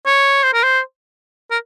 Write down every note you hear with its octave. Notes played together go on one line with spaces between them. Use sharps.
C#5
C5
A#4
C5
A#4